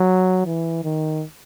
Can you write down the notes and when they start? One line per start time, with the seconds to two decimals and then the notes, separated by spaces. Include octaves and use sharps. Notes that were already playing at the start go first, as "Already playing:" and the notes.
Already playing: F#3
0.46 E3
0.84 D#3